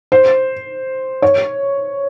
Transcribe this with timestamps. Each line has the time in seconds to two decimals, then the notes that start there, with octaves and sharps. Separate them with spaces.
0.12 C5
1.22 C#5